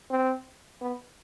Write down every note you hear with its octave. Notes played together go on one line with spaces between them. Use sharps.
C4
B3